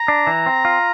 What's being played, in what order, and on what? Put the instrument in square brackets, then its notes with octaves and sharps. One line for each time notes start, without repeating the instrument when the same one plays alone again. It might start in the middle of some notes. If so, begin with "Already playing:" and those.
Already playing: [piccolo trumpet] A#5
[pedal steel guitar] D4
E3
C4
F4